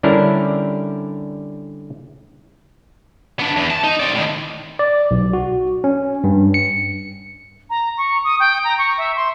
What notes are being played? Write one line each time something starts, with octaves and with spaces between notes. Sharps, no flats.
D3 G3 C#4 D4 E4 A#4
B3 D4
E2
A5
D#4
C4 D5
A2 D#3
D5
B1
F#4
C#4
G2
C#7
A#5
C#6
D#6
G5
A#5
C#6
E5
C6